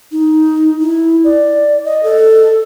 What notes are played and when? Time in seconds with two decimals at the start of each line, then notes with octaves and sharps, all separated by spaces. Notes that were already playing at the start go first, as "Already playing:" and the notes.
0.12 D#4
0.81 E4
1.24 D5
1.85 D#5
2.03 A4